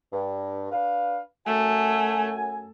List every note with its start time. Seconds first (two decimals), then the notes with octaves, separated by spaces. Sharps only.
0.13 G2
0.72 D4 B4 F5
1.46 F#2 A3 F#4 G#5